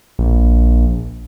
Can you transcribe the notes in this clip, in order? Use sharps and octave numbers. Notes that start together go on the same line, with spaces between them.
A#1